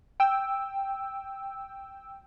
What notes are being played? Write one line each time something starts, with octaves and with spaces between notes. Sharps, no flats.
G5 E6